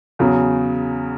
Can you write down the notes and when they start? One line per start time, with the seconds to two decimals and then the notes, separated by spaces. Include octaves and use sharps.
0.19 E2 C#3 F#3